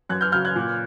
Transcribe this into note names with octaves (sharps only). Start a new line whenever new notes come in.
F#2 F#6 G#6
F6 G6
C#3 F#3 F6 G6
F#6 G#6
A#2